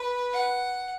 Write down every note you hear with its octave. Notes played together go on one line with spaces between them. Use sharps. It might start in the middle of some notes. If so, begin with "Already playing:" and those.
Already playing: B4
F#5